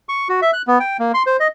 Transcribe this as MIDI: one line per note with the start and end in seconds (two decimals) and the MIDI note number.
0.09 0.28 85
0.29 0.40 66
0.42 0.51 76
0.53 0.62 90
0.67 0.79 59
0.80 0.97 79
0.99 1.12 58
1.14 1.23 84
1.27 1.37 72
1.40 1.48 75